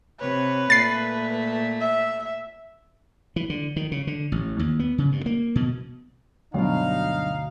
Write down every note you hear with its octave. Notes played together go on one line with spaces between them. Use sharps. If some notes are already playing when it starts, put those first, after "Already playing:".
C3 B4 C#5
A#2 A3 A6 C7
E5
E3
D3
D#3
C#3
D3
A1
D#2
B3
C#3
G2
A#3
B2
D2 G2 B2 F#3 D#4 F5